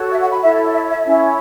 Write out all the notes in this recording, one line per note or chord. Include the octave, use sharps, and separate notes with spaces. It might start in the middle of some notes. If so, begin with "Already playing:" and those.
Already playing: F#4 A4 C#5
E5
F#5
B5
E4 A4 C#5 E5
E5
E5
C#4 E4 C#5 E5